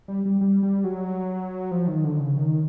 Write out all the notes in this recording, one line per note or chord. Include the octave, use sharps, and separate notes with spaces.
G3
G3
G3
G3
F#3
F3
D#3
D3
C#3
D#3